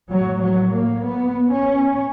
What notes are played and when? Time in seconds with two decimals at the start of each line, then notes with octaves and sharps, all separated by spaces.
0.11 A2 F#3
0.42 F#3
0.73 A#3
1.04 B3
1.51 C#4